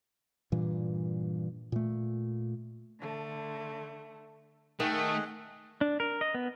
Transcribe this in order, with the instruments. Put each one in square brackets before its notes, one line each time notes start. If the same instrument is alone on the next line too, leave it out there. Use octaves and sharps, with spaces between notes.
[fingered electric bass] G2 A#2 E3
A#2 A3
[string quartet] D3 A3
[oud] D#3 [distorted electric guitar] A3 [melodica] G#4 D#5 F#5 [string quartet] G5
[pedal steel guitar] D4
A#4
D#5
B3